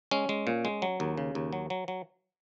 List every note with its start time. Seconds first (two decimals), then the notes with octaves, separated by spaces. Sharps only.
0.11 G#3 C#4
0.29 G#3
0.47 A#2
0.65 G#3
0.82 F#3
1.00 D#2
1.18 C#3
1.35 D#2
1.53 F#3
1.70 F#3
1.88 F#3